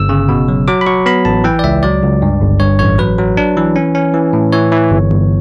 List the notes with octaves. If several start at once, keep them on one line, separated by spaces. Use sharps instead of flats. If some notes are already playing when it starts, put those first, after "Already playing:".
Already playing: G1 E6
C#3
B2
F#3
F#3 D6
B5
F#3 C#6
B3 B5
A1 A5
E3 G5
D5
C#2 E5
F#3 D5
C#2
G2
G1
G2 C#5
A1 C#5
F#3 B4
F#3
D4
E3
C#4
C#4
E3
A2
E3 C#5
E3
G1
G1